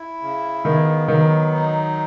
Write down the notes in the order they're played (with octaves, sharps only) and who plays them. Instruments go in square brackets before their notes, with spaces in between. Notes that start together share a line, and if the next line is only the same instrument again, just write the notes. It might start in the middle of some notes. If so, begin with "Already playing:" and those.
Already playing: [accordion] E4
C#3
[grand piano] D#3 [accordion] B3
[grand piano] D#3 [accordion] F#3
[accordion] D#4